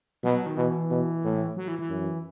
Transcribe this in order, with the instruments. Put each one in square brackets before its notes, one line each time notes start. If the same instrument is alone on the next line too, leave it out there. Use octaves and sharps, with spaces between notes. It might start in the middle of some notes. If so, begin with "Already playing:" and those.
[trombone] B2 [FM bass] F#3
[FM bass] D#3
[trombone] B2 [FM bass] E3
[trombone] B2
A2
[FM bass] F#3
E3
E3
[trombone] F#2